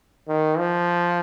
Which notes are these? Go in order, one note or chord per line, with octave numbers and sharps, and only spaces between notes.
D#3
F3